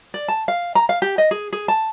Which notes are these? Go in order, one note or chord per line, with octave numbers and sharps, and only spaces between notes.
D5
A5
F5
A#5
F5
G4
D#5
G#4
G#4
A5